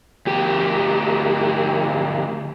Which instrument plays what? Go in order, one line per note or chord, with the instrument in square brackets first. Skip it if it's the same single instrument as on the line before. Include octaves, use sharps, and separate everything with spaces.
[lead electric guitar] D2 G4